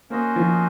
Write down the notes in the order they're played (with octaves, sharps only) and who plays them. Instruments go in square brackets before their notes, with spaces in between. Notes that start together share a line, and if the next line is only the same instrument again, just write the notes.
[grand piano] A#3 [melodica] C#4 F#4 C5 D#5
[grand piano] F3